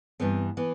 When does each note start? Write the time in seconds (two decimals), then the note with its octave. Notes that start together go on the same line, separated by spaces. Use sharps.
0.20 G2 E3 B3 C4
0.57 E3 B3